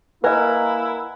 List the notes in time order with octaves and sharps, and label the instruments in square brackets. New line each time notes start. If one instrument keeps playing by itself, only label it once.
[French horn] A#3 [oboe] E4 [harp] A#4 F#5 G#5 [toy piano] B4 D#5